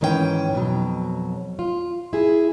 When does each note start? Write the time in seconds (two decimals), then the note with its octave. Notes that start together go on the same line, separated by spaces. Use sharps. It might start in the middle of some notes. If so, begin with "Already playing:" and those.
0.01 G#2 D#3 E3 C#4 B4 G5
0.53 F2 B2 F#3
1.59 F4
2.13 E4 G#4